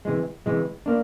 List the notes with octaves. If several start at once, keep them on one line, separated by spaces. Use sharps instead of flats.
C3 E3 G#3
C3 E3 G#3
A#3 D4